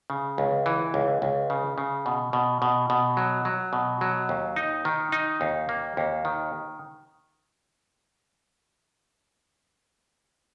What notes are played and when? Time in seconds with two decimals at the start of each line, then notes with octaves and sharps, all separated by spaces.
0.10 C#3
0.38 C#2
0.66 E3
0.94 C#2
1.22 C#2
1.50 C#3
1.78 C#3
2.06 B2
2.33 B2
2.62 B2
2.90 B2
3.17 F#3
3.45 F#3
3.73 B2
4.01 F#3
4.29 D#2
4.56 D#4
4.85 D#3
5.12 D#4
5.41 D#2
5.69 A#3
5.97 D#2
6.25 D#3